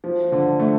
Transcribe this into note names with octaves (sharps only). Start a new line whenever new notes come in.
F3
D3
A3